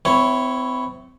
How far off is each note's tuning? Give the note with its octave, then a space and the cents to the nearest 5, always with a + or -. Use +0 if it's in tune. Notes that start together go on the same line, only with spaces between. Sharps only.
C4 -35 E4 +0 C#5 +0